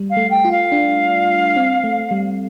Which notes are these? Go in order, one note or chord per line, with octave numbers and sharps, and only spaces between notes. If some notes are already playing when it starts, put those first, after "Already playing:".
Already playing: G3
F5
A3
G5
F4
F5
D4
C4
A3
G3